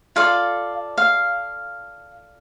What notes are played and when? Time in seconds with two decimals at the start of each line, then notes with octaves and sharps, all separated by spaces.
0.16 F4 A4 D5 F5
0.98 F5